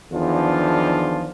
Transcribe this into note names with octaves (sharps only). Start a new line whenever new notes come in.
E2 D#3 F3 D4 F4